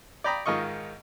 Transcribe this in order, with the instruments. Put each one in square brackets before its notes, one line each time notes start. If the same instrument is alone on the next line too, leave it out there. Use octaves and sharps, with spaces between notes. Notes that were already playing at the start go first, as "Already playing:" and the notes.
[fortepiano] D5 G5 A#5 B5 D#6
G#2 D#3 F4 D#5 C#6